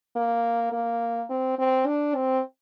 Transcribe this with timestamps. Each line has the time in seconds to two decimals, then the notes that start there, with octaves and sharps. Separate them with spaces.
0.16 A#3
0.72 A#3
1.30 C4
1.59 C4
1.87 D4
2.15 C4